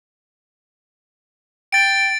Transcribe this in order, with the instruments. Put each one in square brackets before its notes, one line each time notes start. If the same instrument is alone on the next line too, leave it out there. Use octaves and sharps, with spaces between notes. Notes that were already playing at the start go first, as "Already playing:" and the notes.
[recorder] G5 [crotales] A6 D7